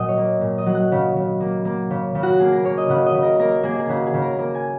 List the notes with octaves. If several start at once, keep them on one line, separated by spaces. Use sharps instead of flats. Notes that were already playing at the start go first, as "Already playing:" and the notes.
Already playing: A#2 F#3 D#5 F#5
C#5
A#3
A#2
D#5
F#3
F#5
C#3
C#3
A#3
A#3
C#3
C#3
F#4
A#3 G#4
A#4
A#3 C#5
D#5
C#3 F#5
D#5
C#3
A#4
A#3 A#4
A#3 G#4
G#4
C#3 F#4
G#4
C#3
A#4
A#3 A#4
G#5